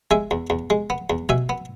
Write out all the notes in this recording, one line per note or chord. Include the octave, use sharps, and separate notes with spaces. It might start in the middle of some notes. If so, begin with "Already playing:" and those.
G#3 E5 G#5
E2
E2
G#3
B3
E2
B2 E5 G#5
B3